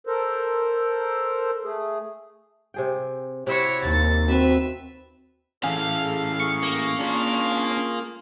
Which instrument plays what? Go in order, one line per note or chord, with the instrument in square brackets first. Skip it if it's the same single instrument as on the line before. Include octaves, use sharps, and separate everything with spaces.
[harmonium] A4 A#4 C5
A3 G#4
[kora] C3 G#4 G5
[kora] C3 [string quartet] E4 F#4 C#5
[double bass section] D#2 [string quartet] A6
[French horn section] C4 F#4 [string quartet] B4 E5
[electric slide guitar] E3 C#4 [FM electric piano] G#4 [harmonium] A4 [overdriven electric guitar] F5
[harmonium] G#4 [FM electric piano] C#6
[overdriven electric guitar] A#3
[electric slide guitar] C#4 D4 [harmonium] F4 G#4